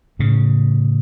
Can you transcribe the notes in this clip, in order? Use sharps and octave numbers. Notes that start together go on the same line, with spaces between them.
A2 C#3